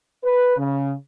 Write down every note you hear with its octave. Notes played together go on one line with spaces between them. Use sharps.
B4
C#3